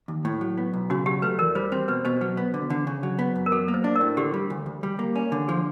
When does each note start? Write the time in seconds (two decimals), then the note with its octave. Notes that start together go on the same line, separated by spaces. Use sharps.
0.08 D#2
0.25 A2
0.41 F#3
0.57 B3
0.73 B1
0.90 C#3 F#4
1.06 F#3 G4
1.22 A3 B4
1.39 E2 A#4
1.55 G3 C5
1.72 C4 C5
1.88 B2 B4
2.05 B2 C5
2.21 F#3 B4
2.37 B3
2.54 D3
2.70 D3
2.87 C#3
3.03 F#3
3.19 B3
3.36 F#2
3.46 A#4
3.52 F#3 A4
3.68 A#3
3.74 C5
3.84 D4
3.96 A#4
4.01 A2
4.17 D3 G4
4.34 G3
4.50 D2
4.66 D2
4.83 G3
4.99 A#3
5.16 C#4
5.32 D3
5.48 F3 G#4